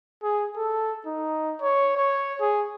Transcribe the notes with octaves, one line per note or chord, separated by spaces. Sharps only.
G#4
A4
D#4
C#5
C#5
G#4